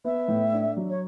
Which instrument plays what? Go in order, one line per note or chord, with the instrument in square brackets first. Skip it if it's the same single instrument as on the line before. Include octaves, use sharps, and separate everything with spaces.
[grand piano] B3 [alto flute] E5
[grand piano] A2
D4
F#3
[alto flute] C#5